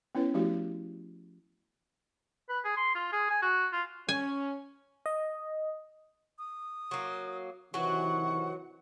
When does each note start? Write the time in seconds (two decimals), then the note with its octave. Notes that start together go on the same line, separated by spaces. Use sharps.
0.15 B3 C#4 E4 B4 C#5
0.34 F3 A3 E4 F#4 G4
2.49 B4
2.64 G#4
2.77 C6
2.95 F4
3.12 G#4
3.30 G#5
3.42 F#4
3.72 F4
4.09 C#4 G#5
5.06 D#5
6.39 D#6
6.91 F#3 A#3
7.74 C3 D#3 E3 F#3 F#4 F#5 C#6